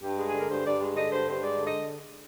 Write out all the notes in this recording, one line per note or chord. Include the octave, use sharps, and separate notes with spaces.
G2 G4
G#3
G#4
D3
A#4
G2 C5
G2 D5
G#3
D3 D#5
G2 C5
G2 C5
G#3 D5
D3
D#5